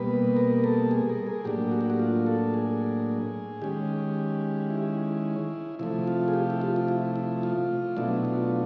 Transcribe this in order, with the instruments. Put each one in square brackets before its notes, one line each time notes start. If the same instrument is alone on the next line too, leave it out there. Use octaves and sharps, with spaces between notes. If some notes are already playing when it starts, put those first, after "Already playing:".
Already playing: [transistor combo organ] B2 G3 A#3 B4
A#4
A4
G#4
A#4
G#4
A2 F#3 A#3 D4 G4
F#4
G4
F#4
F4
A4
G#4
D#3 G#3 C#4 G4
E4
C3 F3 A3 E4
F4
G#4
G4
E4
F4
F4
E4
E4
F4
B2 F#3 A3 D4 E4
E4
F4